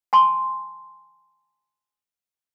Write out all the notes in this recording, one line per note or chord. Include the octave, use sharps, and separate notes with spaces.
G#5 A5 C6